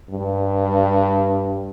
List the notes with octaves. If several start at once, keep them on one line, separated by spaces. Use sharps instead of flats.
G2